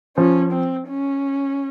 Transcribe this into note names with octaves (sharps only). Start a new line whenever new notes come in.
F3 C#4
C4
C#4